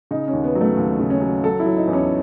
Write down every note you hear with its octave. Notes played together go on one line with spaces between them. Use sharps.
C#3 D#4
C#4
D#2
B3
F#3
A3
D#2
C#3
C#4
F#3
F#3 A4
E4
F#3
D#4
E2
C#4